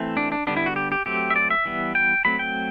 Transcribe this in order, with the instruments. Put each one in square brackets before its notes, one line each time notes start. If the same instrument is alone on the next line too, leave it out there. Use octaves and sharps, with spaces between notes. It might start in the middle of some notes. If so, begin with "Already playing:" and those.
Already playing: [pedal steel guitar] E3 A3 C4
D4
D4
D3 G3 B3 D4
E4
F#4
G4
G4
F#3 A3 C4 G4
E5
D5
E5
E3 G3 B3
G5
F#3 A3 C4 B5
G5